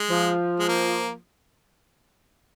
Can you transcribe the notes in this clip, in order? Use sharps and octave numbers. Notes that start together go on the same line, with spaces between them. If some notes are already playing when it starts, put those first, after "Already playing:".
Already playing: G#3
F3
G#3
A#3